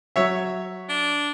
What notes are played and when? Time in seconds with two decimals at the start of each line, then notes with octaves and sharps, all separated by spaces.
0.16 F#3 C#5 E5
0.89 D4